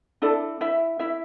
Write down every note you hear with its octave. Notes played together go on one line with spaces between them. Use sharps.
D4 E4 A4 D5
E4 E5
E4 E5